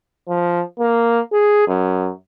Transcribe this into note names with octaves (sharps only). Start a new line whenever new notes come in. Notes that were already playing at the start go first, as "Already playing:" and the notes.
F3
A#3
G#4
F#2